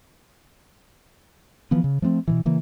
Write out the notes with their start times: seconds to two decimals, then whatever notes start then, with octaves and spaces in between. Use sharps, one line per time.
1.71 E3 F3 B3
1.84 C#3
2.02 F3 A3 B3 C4
2.28 B2 D3 E3
2.45 C#3 E3 A#3